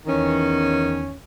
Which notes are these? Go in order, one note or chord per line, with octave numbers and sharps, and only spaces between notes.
E2 D#3 E3 C#4